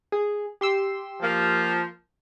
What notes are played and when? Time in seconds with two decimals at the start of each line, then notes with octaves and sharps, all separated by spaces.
0.12 G#4
0.61 G4 C6 E6
1.21 F3 A#3